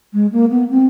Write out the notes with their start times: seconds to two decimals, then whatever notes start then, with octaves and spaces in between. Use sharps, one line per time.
0.13 G#3
0.32 A#3
0.51 B3
0.70 C4